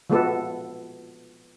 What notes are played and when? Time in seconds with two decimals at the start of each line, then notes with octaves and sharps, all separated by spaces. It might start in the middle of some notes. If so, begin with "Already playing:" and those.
0.10 F3 G#3 B3 F#4 A4 B4